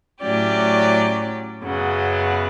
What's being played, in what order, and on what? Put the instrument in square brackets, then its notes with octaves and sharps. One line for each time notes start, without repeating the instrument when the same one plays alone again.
[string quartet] A2 F#3 C#4 G4 D5
F#2 C#3 F#3 B3